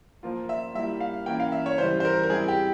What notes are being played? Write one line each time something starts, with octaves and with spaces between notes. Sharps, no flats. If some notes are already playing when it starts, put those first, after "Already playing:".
F3 A#3 F4
E5
G3 A#3 E4 E5
F5
E3 A#3 C#4 E4 G5
F5
E5
C#5
C#3 E3 G3 C5
C5
A#4
A#4
G3 C4 E4 G#4
G4